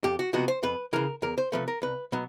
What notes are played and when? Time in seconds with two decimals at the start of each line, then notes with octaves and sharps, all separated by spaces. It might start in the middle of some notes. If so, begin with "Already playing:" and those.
0.04 F2 G4
0.19 F#4
0.33 C3 F3 G#3 B3 F#4
0.48 C5
0.63 F2 B4
0.93 C#3 E3 A#4
1.22 E2 A#4
1.38 C5
1.52 C3 F3 A3 B4
1.68 A#4
1.82 C2 B4
2.12 B2 F#3 B3